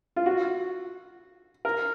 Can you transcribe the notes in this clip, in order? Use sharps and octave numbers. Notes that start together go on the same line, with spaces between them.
F4
F#4
A#4